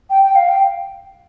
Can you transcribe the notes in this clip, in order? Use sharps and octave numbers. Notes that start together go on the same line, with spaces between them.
G5
G5
F5
G5